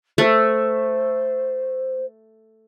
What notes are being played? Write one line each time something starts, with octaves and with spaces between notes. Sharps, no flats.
A3 C5